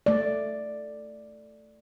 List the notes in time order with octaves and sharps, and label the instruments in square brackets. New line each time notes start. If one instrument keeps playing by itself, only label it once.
[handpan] A3 D5